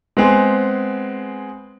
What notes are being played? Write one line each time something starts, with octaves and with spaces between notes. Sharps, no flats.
G#3 B3 C4 G#4